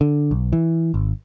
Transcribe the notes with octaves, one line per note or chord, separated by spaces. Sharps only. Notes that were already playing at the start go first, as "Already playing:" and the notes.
D3
B1
E3
G#1